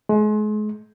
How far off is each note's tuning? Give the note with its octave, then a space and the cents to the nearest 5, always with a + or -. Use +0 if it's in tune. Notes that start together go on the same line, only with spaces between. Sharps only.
G#3 +35